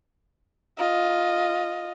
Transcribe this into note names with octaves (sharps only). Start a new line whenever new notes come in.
F4 D#5